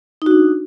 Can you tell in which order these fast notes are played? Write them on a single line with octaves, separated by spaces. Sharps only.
D#4 F#4 D4